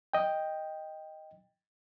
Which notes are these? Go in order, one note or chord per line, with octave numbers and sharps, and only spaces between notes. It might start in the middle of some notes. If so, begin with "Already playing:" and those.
D#5 G5